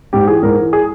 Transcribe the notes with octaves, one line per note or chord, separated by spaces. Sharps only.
G#2 G4
E3 G#4
G#2 A#4
E3
G#4